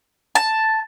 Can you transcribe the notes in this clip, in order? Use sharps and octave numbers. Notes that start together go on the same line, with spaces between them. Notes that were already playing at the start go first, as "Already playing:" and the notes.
A5